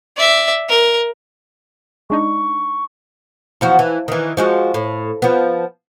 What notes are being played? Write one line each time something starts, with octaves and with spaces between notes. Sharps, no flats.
D5 E5
A#4
G#3 D4 D#4 C#6
E2 F3 F#4
E3
D#3 E3
F3 G#3 F#4
A2
F3 B3